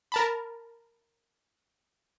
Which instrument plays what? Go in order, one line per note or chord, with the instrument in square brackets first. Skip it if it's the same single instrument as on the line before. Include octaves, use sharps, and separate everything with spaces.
[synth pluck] A#4 A5 B5